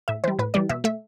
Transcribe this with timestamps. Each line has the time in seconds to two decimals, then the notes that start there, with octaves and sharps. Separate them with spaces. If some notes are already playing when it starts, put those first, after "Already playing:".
0.08 A2 E5
0.24 E3 G3 C5
0.39 A2 B4
0.54 E3 G3 D5
0.69 B2 E5
0.84 A3 E5